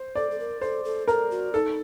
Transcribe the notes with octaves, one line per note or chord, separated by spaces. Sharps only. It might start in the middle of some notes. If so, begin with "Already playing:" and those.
Already playing: C5
A4 D5
A4
A#4
A4 C5
A4
A4 A#4
F#4
D#4 A4